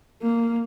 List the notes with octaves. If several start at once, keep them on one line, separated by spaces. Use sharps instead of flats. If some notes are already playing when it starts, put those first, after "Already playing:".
A#3